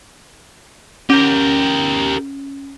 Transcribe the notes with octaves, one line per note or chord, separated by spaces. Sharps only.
C#4 G4 A#4